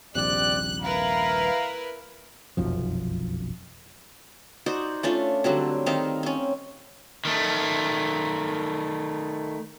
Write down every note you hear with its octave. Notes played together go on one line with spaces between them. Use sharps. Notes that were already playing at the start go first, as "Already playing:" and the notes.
D#1 A#1 C3 C4 G4 D5 F#6
E4 A#4 B4 F5 A#5
F1 B1 F#2 F3
D#4 F#4 C5 D5
A3 C#4 D4 F4
D3 F#3 G3 C4
D#3 C4 D#4 F5
C4 C#4
D#3 A3